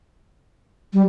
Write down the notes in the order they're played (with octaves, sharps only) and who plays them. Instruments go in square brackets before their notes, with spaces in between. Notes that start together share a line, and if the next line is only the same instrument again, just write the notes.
[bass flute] G3